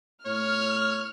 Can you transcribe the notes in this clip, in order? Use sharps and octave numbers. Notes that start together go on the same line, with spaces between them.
A2 C#5 F6